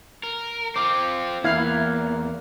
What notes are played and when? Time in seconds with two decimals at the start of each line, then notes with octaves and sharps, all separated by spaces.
0.23 A#4
0.76 C4 F4 D6
1.44 E2 A#3 E4 F5 F6 F#6 G#6